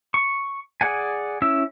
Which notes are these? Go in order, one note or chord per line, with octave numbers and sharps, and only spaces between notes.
C#6
G#4 D5 F#5 G#5
C#4 E4 E6